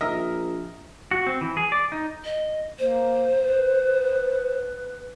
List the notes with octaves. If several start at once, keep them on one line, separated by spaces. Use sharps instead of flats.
A#1 A#4 D#5 E5
F#4
C4
E3
G#4
D5
D#4
D#5
A#3 C5
B4